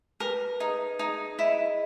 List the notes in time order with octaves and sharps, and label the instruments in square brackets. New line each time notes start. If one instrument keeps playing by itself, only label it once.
[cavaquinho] A#4 [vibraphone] B4
[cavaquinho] D#4 [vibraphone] G#4
[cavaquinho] D#4 [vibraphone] G#4
[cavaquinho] E4 [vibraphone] D#5